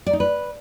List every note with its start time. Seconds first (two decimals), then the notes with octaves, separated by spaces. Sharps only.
0.06 D5
0.13 D#4
0.20 B4